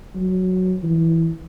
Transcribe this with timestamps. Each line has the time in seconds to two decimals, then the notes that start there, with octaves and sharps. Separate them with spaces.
0.15 F#3
0.83 E3